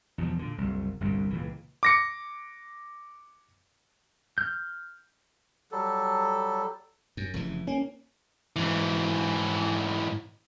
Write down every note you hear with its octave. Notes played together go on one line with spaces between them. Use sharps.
E2 B2 E3 F3
A#2 D3
F#1 C2
G1 C2 G2 A#2
C#2 A#2 E3
D6 A#6 C#7
F6 G6
F#3 G3 A4
F#2
F1 C#3 E3
A#3 C#4
G#2 E3